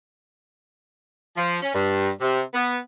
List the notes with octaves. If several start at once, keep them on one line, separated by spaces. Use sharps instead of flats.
F3
C#4
G2
C3
B3